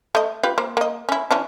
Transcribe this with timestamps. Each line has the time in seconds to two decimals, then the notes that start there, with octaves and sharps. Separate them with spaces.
0.15 A3 D#5
0.43 F4 G4 B4
0.58 A#3 C5
0.77 A#3 D#5
1.09 C#4 E4
1.31 E3 C#4 D4